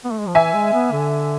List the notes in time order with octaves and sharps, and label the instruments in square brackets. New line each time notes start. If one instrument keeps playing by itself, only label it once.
[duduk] B3
A3
G#3
F3
[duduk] E3 [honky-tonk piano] E5 G#5
[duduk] G#3
B3
D3